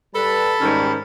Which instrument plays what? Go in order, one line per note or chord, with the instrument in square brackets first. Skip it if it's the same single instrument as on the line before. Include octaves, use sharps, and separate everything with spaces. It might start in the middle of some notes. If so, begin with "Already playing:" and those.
[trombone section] G3 B4 [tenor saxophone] A4 [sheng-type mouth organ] A5 B5
[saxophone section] G#2 D#3 C#4 [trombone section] G3